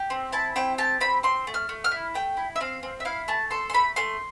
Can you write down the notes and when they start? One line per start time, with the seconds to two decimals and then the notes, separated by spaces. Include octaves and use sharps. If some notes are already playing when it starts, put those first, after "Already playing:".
Already playing: G4
0.10 C4
0.32 E4 A5
0.56 C4 G5
0.78 G4 A5
1.00 C4 B5
1.23 C4 C6
1.47 A3
1.54 F6
1.69 A3
1.84 F6
1.91 E4
2.14 A3 G5
2.37 E4
2.56 E5
2.61 C4 F5
2.83 C4
3.00 E5
3.05 E4 F5
3.28 A3 A5
3.51 A4 C6
3.70 C6
3.73 A3 B5
3.96 A3 C6